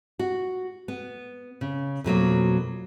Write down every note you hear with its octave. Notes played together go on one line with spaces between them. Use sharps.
F#4
B3
C#3
F2 B2 F#3 A#3